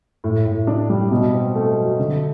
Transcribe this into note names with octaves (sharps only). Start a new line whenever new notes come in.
A2
A2
D4
G3
B2
C4
A3
F#3
D3